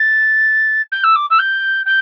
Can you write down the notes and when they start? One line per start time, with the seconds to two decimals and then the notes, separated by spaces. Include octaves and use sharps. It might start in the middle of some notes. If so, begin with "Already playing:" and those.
Already playing: A6
0.92 G6
1.04 E6
1.15 D6
1.30 E6
1.39 G6
1.86 G6